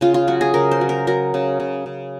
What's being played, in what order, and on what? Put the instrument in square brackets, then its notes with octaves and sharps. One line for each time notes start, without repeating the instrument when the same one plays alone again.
[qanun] C#3 F4
F4
F#3 F#4
G#4
C#3 A#4
C5
F#3
A#4
F#3 A#4
C#3
C#3
C#3